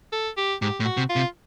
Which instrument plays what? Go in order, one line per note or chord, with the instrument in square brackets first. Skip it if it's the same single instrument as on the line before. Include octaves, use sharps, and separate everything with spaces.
[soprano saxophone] A4
G4
[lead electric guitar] G#2 [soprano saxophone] G4
[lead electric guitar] A2
[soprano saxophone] F#4
[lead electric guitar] C3
[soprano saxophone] F4
[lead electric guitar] C3